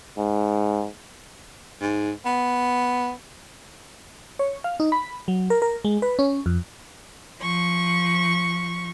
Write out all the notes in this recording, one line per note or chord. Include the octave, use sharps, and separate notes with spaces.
G#2
G#2
B3
C#5
F5
D#4
B5
F#3
A#4
A#4
G#3
B4
C#4
F2
F3 C#6